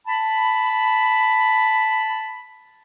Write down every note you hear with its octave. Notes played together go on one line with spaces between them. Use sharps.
A5 B5